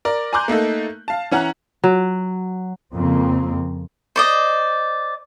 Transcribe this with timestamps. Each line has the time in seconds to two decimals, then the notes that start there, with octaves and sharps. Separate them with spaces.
0.05 A#4 D5
0.33 G#5 A#5 C6 D6 F#6 G6
0.48 A3 A#3 D#4 A4
1.08 F5 A5
1.31 E3 C#4 F#5 A#5 F#6
1.84 F#3
2.95 F2 C#3 A#3 C4
4.16 C5 D5 D#5